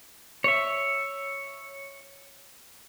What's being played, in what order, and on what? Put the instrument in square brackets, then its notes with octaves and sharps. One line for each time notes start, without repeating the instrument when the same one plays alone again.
[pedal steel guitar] C#5 E5